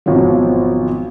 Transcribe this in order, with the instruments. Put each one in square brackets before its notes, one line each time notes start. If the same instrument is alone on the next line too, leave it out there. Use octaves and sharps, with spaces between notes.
[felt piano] G#1 B2 F3 F#3